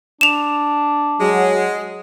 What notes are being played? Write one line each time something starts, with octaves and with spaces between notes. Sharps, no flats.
D4 E7 F7
F#3 G#3